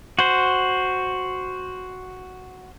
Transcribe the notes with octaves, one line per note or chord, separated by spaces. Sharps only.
F#4 C5